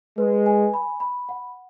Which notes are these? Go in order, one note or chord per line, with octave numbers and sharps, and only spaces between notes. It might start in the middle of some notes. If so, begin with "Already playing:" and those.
G#3 B4
G#5
B5
B5
F#5